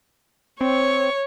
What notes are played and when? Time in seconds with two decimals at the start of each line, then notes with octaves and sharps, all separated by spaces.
0.61 C4 C#5